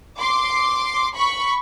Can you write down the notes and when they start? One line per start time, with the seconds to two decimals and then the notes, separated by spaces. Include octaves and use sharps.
0.20 C6 D6
1.17 B5 C#6